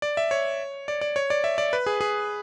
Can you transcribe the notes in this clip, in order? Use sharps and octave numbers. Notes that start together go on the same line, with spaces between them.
D5
E5
C#5
D5
D5
C#5
D5
E5
D5
B4
G#4
G#4